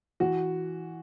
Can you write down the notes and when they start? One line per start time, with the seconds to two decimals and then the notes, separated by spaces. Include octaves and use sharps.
0.20 E3 F#4